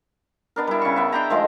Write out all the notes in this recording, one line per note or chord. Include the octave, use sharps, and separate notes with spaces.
B3 D4 A#4
G3 E4
C#3 C#6
B3 E5
D4 G5 A#5
D#3 F3 G#3 A3